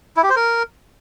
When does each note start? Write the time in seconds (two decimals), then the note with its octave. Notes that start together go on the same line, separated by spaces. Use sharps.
0.17 E4
0.23 G4
0.30 C5
0.36 A#4